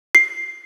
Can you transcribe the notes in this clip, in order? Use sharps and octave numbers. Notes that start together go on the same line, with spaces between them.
C7